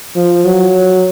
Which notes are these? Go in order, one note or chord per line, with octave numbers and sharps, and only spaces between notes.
F3
F#3